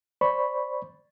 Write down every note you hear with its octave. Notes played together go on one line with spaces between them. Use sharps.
C5 D5 B5 C#6